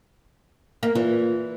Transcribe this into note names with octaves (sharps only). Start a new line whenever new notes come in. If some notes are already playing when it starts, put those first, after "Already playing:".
A#3
A#2 E3